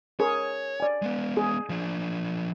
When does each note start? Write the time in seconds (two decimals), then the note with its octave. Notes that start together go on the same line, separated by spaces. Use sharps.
0.20 G#4 A#4 C#5
0.80 D5 G#5
1.02 G#3 B3
1.37 G#4
1.70 F3 D4